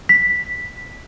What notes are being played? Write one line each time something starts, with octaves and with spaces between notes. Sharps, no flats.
B6